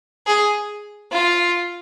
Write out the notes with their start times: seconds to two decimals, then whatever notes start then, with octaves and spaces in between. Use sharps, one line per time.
0.27 G#4
1.12 F4